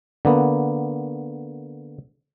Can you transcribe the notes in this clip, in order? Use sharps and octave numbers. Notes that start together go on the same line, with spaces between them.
D3 A#3 B3